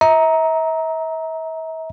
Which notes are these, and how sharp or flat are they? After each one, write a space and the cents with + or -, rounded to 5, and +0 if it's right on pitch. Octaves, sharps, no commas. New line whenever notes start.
E5 -40 A#5 +5